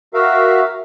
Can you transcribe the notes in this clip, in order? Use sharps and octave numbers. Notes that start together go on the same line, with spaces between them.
F#4 A#4 E5 F5